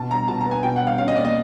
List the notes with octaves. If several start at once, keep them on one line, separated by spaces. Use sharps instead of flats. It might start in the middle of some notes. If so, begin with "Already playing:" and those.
Already playing: B2 A5
G3 A#5
B2 A5
A#5
B3 G#5
B2 G5
F#5
G3
F5
C#4 F5
D#5
A#3 D5
D#5